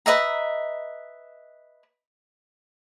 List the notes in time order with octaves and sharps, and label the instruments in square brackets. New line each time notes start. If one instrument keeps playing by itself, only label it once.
[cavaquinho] B4 D#5 E5 A#5